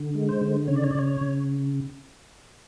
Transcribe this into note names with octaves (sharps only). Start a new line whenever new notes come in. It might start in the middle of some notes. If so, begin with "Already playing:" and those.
Already playing: D3
G#3
C5
D3
C#3 C#5
D5
C#5
D5
C#3 C#5
C#5
C#3